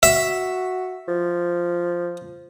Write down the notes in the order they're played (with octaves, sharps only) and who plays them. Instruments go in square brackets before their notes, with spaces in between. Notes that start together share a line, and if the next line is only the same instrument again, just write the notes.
[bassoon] F#4 [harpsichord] E5
[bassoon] F3